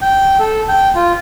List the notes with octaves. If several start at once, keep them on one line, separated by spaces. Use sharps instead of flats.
G5
A4
G5
F4